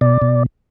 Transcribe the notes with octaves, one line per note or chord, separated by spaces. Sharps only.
B2 D5
B2